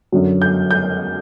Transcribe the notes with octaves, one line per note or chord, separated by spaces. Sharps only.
F#2 D3 F#3
G6
G6